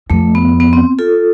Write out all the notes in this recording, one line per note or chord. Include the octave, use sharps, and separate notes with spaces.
F2 A3
B3
B3
C4
F4 A4